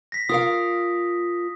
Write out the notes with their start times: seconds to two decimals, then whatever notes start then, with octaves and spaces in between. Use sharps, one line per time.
0.12 A#6 B6
0.29 F4 A#4 F5 D#6